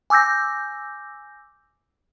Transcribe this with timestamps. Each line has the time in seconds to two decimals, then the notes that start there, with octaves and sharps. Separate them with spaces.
0.10 G#5 D6 E6 G6 A#6